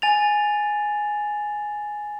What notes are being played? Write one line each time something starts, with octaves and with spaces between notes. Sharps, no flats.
G#5 A6 F7